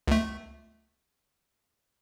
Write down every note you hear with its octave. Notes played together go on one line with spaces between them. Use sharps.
C#2 A3